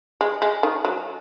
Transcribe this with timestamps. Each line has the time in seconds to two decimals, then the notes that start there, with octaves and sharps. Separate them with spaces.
0.21 G#3
0.42 G#3
0.63 D#3
0.85 F#3